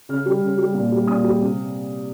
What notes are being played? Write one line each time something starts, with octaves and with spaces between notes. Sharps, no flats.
C#3 F6
G3
C#3
G3
A#2
G3
A#2 D#6
G3
C3